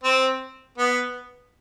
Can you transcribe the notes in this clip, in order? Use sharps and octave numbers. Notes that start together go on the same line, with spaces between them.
C4
B3